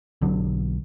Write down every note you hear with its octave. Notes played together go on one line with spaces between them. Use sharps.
B1 D3 F#3